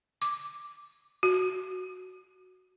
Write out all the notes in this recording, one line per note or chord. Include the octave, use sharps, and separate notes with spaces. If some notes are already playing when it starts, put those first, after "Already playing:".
D6
F#4